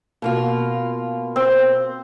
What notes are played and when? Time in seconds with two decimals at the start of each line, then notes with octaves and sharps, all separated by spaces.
0.22 B2 A#3 F4
1.36 C4